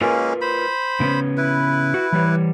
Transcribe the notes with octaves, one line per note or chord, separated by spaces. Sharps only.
G#3 A#3 C#4 F4 A#4 B4
C5 B5
C#3 B3 C#4
E4 B4
F#4
E3 G3 C#5